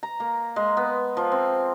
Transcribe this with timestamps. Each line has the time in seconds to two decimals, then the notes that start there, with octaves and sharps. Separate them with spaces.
0.03 A#5
0.20 A#3
0.56 G#3
0.77 B3
1.17 F3
1.32 C4